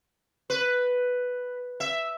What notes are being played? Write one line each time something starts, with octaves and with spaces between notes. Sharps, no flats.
B4
E5